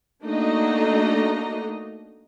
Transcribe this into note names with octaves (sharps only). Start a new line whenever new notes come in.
A3 A#3 D4 D#4 F#4 D#5